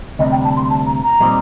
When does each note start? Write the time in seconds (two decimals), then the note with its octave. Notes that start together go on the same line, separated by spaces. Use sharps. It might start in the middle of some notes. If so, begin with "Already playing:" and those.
0.19 D2 C3 G3 D#5
0.32 G5
0.44 A5
0.56 C6
0.70 A5
0.86 A#5
1.03 A#5
1.20 A#2 G3 C4 D#4